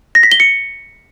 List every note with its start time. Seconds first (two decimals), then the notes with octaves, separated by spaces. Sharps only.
0.15 A#6
0.23 B6
0.32 G7
0.40 C#7